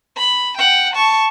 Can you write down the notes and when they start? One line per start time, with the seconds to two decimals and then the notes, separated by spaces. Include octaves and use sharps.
0.17 B5
0.58 F#5 G5
0.94 A5 C#6